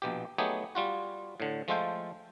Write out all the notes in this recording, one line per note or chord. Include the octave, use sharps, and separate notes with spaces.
A#1 B2 G4
F#3 A3 B3 D#4 G4 G#4
G3 F4 F#4
A2 D3
F3 G#3 A3 F4 A4 G5